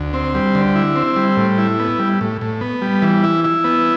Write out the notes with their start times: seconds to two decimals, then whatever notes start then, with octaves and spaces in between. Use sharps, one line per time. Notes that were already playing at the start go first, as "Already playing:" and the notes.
Already playing: D2
0.14 C4
0.35 G3
0.55 D3
0.75 E4
0.96 C4
1.16 G3
1.37 A2
1.58 E4
1.80 B3
1.99 G3
2.21 A2
2.41 A2
2.61 B3
2.82 G3
3.02 E3
3.24 E4
3.44 E4
3.64 B3